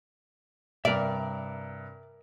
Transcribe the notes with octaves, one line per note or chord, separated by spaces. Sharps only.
G2 C3 A#4 D5 E5